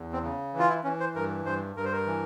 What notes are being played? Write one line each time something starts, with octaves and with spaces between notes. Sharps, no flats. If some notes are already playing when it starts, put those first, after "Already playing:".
Already playing: E2
C4
C#3
E3
F4
E4
E3 C#4
C5
G2 A#4
G2 C5
G2 A#4
C5
A#4
E3